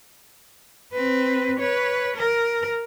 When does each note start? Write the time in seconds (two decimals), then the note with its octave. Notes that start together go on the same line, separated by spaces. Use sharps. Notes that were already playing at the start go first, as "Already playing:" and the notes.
0.94 C4 B4
1.59 B4 C#5
2.17 A#4